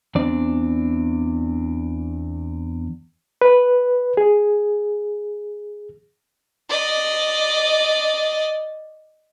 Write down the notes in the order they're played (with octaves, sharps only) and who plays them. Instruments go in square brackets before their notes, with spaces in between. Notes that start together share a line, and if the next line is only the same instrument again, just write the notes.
[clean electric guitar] E2 C4 D4 D5
[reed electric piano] B4
G#4
[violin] D5 D#5